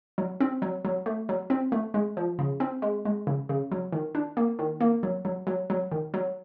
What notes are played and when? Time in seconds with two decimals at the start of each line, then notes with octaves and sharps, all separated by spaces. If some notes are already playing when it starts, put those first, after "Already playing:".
0.18 F#3
0.40 C4
0.62 F#3
0.85 F#3
1.06 A3
1.29 F#3
1.50 C4
1.72 A3
1.94 G#3
2.17 F3
2.39 C#3
2.60 C4
2.82 G#3
3.05 G#3
3.27 C#3
3.49 C#3
3.72 F#3
3.92 D#3
4.15 D4
4.37 A#3
4.59 D#3
4.81 A#3
5.03 F#3
5.25 F#3
5.47 F#3
5.70 F#3
5.92 D#3
6.14 F#3